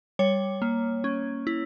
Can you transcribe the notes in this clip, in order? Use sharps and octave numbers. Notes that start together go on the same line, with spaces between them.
G3 C#5
A#3
C#4
E4